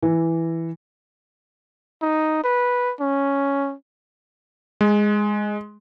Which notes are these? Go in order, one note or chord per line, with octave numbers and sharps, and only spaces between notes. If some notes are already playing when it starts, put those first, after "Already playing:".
E3
D#4
B4
C#4
G#3